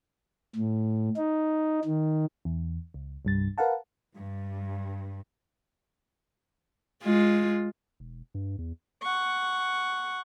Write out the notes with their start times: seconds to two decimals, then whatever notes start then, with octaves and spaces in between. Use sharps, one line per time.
0.55 A2
1.16 D#4
1.85 D#3
2.45 E2
2.94 C#2
3.25 C2 G2 A6
3.58 A#4 B4 F5 F#5 A5
4.16 G2
7.03 G#3 F4
8.00 E1
8.35 G2
8.58 E2
9.03 F#5 C#6